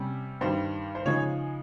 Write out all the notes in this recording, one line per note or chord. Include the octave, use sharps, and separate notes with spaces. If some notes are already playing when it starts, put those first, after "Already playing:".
Already playing: C3 G3 C#4
G2 D#3 G3 C5
C5
C#3 F3 G#3 D#4 C#5